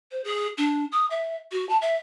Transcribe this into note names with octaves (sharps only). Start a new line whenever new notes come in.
C5
G#4
D4
D#6
E5
F#4
A5
E5